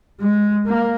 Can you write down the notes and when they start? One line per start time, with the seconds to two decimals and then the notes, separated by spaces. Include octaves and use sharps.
0.20 G#3
0.66 A#3